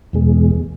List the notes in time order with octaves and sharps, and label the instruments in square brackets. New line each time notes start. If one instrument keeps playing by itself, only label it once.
[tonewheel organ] E2 B2 G#3